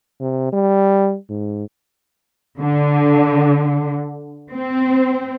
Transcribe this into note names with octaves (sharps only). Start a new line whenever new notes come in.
C3
G3
G#2
D3
C4